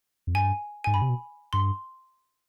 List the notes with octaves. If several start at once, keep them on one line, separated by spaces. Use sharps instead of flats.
F2
G2 G#5
G#2 G#5
G2 B5
C3
B2
G2 C6